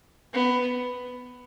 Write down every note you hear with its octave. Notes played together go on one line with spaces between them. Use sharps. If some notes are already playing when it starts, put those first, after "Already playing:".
B3